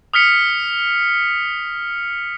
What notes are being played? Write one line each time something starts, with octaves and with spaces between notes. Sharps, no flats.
D#6 F6 B6 C#7